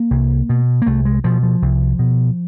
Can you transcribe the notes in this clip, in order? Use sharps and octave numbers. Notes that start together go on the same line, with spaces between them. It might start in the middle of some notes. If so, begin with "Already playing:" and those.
Already playing: A#3
C2
B2
A#3
C2 A3
G#3
B2 F3
F3
C2
B2